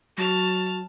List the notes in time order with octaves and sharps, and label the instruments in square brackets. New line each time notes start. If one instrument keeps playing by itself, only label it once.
[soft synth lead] F#3 [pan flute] F#4 [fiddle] A5 F6